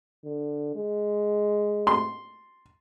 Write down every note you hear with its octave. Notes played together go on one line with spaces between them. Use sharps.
D3
G#3
C6